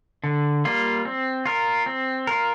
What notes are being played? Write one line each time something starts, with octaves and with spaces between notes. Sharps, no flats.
D3
G3 A#3 F4
C4
F4 A#4
C4
F4 A#4